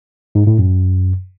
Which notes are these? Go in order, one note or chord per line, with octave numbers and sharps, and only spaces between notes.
G#2
A2
F#2